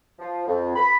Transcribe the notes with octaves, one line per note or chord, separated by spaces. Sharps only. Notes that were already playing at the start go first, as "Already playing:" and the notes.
F3
F2
B5